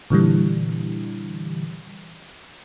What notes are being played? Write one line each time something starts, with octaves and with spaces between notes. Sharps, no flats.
A#2 D3 E3 G3